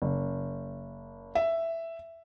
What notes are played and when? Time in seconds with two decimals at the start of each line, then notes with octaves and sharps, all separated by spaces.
0.02 F#1
1.35 E5